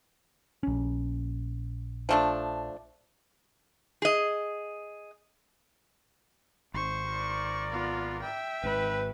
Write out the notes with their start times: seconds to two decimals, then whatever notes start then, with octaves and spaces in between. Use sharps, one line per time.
0.63 A#1 C#4
2.09 F3 A3 D4
4.02 G#4 D#5
6.74 G#1 C5 C#6
7.09 A#4 D5
7.71 B3 F4
8.22 E5 G5
8.63 G#1 G#2 B4